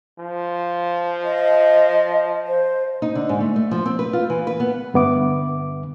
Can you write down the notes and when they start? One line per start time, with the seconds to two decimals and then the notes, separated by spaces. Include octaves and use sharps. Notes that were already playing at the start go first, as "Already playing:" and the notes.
0.19 F3
1.24 D#5
2.48 C5
3.02 D#4
3.15 D3
3.29 G#2
3.40 A3
3.56 A3
3.71 F3
3.86 C4
3.99 B4
4.13 F4
4.30 E3
4.47 B4
4.60 B3
4.94 G2 D3 B3 E5 D6